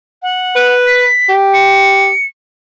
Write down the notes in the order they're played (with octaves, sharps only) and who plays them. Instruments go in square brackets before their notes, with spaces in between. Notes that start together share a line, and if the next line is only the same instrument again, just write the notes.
[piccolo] F#5
[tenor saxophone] B4
[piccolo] B6
[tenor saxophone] G4
[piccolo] C#7